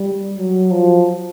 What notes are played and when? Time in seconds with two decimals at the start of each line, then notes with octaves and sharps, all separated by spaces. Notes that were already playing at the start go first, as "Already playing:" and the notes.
Already playing: G3
0.38 F#3
0.71 F3